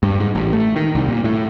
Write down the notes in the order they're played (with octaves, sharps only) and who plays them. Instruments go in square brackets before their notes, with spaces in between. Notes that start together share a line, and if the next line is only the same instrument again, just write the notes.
[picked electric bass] G2
G#2
A1
A3
D#3
C2
A#2
A2